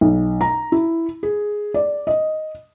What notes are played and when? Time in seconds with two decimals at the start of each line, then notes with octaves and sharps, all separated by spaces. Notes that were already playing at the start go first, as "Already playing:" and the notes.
0.01 B1
0.41 A#5
0.72 E4
1.23 G#4
1.74 D5
2.07 D#5